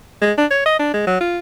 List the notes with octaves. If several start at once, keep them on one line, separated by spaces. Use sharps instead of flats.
G#3
D4
C#5
D#5
D4
G#3
F#3
F4